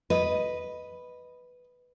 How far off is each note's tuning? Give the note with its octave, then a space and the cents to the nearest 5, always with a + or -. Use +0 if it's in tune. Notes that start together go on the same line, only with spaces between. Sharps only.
B4 +0 D#5 +0